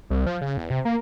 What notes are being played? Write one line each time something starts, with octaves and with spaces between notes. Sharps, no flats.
C2
F3
C#3
E2
C3
A#3